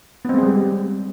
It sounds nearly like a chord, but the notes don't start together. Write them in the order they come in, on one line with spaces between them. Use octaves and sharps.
B3 C4 G#3 G#4 G3